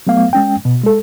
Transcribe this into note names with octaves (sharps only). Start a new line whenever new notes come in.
F#3 A3 B3 F5
G#3 C#4 G5
B2
G#3 A4